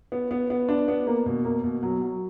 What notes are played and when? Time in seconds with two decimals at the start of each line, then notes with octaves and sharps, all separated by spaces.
0.12 B3
0.31 B3
0.50 B3
0.69 D4
0.88 B3
1.07 A#3
1.26 B2
1.45 A#3
1.64 B2
1.83 F#3
2.02 F#3